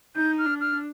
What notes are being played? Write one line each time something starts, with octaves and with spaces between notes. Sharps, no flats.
D#4 G6
F6
D4
F6